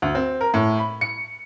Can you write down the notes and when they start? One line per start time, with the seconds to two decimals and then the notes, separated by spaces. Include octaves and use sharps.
0.02 D2
0.15 C4
0.41 A#4
0.54 A2
0.79 B5
1.01 C#7